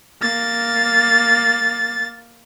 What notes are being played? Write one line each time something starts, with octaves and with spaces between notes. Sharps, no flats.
A#3 A6